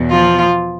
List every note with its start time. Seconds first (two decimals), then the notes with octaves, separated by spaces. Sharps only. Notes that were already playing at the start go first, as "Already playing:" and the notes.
Already playing: E2 B2
0.11 F3 F4